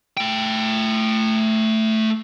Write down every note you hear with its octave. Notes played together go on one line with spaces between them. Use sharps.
A3 G5